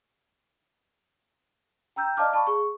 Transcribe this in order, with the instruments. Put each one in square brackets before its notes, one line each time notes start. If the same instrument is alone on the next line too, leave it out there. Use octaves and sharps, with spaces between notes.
[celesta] G5 A#5 E6 G6
D5 D#5 F5 A5 D6 F6
F5 A5 B5 C#6
G#4 C#6